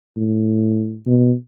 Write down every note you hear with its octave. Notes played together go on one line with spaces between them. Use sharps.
A2
B2